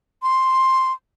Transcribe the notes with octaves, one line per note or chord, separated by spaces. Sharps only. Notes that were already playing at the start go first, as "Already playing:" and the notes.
C6